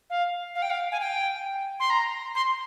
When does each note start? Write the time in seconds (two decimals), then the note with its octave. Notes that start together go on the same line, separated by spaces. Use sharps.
0.10 F5
0.55 F5
0.62 G5
0.70 F5
0.92 G#5
1.00 G5
1.80 C6
1.90 A#5
2.35 C6